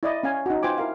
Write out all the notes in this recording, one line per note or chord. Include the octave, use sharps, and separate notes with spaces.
E4 D5 D#5
C#4 F5 G#5
D#4 F#4
F4 B4 C5 G5 G#5 D6
E4 A#4 F5